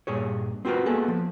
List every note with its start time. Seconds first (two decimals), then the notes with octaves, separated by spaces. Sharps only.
0.07 G2 A#2 G#4 C#5
0.65 C4 F4 F#4 G#4 A#4 B4
0.86 A#3 B3 G#4 A4
1.08 F3